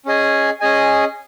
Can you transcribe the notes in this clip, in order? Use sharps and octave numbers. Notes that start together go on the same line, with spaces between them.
C#4 G#4 D#5 G#5
C#4 G#4 D#5 G#5